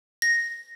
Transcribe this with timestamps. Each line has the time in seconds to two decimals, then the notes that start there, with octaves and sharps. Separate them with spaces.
0.22 A#6